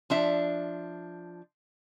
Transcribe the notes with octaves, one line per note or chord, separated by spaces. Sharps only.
F3 D4 E5